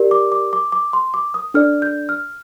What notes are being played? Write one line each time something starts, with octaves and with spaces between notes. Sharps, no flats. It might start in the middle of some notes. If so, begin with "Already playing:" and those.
Already playing: G4 A#4 D5
D6
D6
D6
D6
C6
D6
D#6
D4 A4 D5 F6
G6
F6